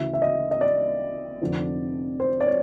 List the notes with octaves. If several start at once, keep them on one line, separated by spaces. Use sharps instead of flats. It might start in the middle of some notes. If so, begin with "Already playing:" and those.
Already playing: D2 C#3 E3 E5
E5
D#5
D#5
D5
F1 F2 D3 F3
C5
D5
C#5